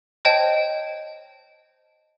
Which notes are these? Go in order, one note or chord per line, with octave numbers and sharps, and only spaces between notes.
C5 C#5 D#5 G5 A5